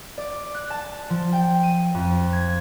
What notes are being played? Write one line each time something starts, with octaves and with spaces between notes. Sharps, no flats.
D5
F#6
A5
F3
G5
D#7
F2
G#6